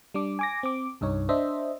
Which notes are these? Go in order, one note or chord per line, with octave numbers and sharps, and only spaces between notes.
G3 D4 D6
G#5 D6 A#6
C4 D6
C2 G2 D#4 C#5
D4 C5 D#5 E5